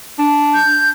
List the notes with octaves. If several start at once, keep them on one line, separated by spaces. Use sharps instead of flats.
D4
G6